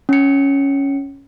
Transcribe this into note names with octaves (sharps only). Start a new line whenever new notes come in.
C#4 C#7